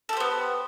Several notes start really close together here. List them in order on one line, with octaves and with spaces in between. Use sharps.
A4 G4 C5 B3